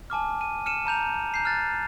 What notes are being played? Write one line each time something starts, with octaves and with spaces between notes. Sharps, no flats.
G#5 A5 D6 F6
D#7
F6 C#7 D#7 E7
A5 A#5 G6 F7
A#5 G6 C7
F6 F#6 A6